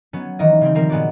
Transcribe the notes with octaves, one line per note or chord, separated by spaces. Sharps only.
F#3 B3 C#4
D#3 E3 G3 D#5
C#3 G3 C4
F3 G3 A#3 C4 A#4
A#2 G#3 B3 F#4 D5